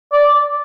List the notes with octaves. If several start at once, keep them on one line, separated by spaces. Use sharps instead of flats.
D5